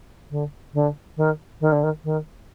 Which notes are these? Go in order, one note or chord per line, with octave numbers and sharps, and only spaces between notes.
D3
D3
D#3
D#3
D3
D#3
D#3